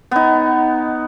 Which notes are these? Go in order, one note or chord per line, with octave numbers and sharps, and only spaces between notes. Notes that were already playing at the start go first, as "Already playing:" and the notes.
B3 D#4